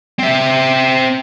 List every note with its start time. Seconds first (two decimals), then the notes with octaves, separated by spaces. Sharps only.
0.19 C4 E5